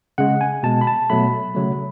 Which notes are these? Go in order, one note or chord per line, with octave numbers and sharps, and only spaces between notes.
C#3 G#3 F#5
G#5
B2 G#3 A5
B5
A5
B2 F#3 A3 B5
C#3 F#3 A3